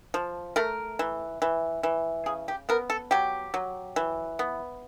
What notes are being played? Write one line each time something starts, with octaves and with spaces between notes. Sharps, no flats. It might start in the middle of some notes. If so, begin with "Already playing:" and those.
F3
A3 A#4
E3
E3
E3
C#3 G#4
G4
B3 A#4
A4
F#3 G4
F#3
E3
B3